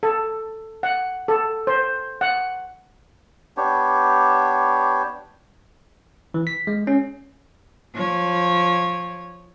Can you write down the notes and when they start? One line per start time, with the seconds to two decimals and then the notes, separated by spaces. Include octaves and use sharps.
0.03 A4
0.83 F#5
1.28 A4
1.67 C5
2.21 F#5
3.57 B3 D4 G4 C#5
6.34 E3
6.47 B6
6.67 G#3
6.87 C#4
7.94 F3 C#5